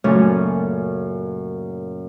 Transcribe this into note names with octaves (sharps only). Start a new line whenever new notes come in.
F#2 A#2 C#3 A3 C#4 G#5